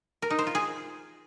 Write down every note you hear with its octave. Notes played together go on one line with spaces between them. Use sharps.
A#4
D#4
C5
F4
G#4